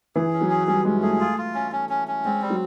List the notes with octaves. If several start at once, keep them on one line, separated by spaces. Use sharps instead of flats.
E3 G#4
C#4
F#3
G#4
G3 C#4
G#3 C#4
A3 G#4
F4
F4
C#4
C#4
C#4
C#4
G#3 C4
G3
F#3